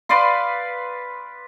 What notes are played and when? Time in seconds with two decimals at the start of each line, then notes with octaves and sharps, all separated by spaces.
0.09 B4 D5 F5 C6